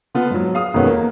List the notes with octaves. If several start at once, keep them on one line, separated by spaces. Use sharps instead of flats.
D3 B3 F4
G#2 F#3
G#4 F5 D#6 F6
E1 D#3 B3 C#4 A4
A#3